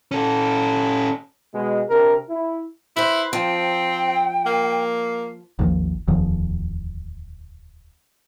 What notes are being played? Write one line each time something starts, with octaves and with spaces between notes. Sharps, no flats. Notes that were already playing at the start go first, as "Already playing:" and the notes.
C#4 A4
B2 G#3
C3 D4 A#4
E4
E4 B4 C5
F3 C4 G5
A#3
G#1 D#2 F3
D1 E2 D#3 F3